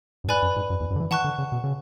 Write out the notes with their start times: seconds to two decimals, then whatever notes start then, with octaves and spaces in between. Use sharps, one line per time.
0.24 F#2
0.28 G#2 B4 D5 G#5 B5 F#6
0.42 F#2
0.56 G#2
0.70 F#2
0.80 E2
0.90 F#2
0.96 D3
1.00 E3
1.11 E3 F#5 A5 C#6 F#6
1.24 D3
1.38 C#3
1.52 B2
1.64 C#3